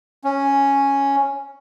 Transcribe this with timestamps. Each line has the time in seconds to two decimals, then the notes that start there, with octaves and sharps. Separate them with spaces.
0.24 C#4